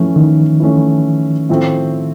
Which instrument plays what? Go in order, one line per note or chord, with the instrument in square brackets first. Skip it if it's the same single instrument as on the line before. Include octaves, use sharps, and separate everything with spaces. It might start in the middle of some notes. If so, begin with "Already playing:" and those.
Already playing: [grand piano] E3 A3 C#4 [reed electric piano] F3
[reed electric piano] D#3
[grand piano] E3 A3 C#4
A2 F3 A3 C4